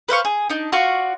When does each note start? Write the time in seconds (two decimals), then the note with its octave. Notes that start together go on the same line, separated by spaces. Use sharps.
0.09 B4 C5 F5 C#6
0.25 G#4
0.50 D4 D#4
0.72 F4 F#4 D5 C#6